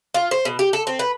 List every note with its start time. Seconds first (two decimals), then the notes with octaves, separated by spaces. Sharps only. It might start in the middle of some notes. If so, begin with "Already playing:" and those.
0.14 F4
0.31 C5
0.45 B2
0.59 G4
0.73 A4
0.87 C4
0.99 B4